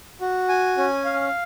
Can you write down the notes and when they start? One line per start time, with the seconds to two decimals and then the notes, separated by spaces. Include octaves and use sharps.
0.21 F#4
0.49 G#5
0.78 C#4
1.05 F5